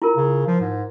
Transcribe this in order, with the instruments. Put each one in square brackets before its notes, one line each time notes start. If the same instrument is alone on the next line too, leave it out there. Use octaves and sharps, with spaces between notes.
[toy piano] E4 F4 A#4
[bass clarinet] C#3
F3
G#2